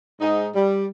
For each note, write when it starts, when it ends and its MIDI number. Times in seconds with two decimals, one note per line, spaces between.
0.20 0.49 44
0.20 0.49 63
0.54 0.85 55